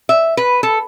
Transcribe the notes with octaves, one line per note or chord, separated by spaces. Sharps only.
E5
B4
A4